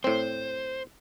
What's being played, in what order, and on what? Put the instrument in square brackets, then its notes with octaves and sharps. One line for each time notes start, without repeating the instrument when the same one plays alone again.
[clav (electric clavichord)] A2 C4 [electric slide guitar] C5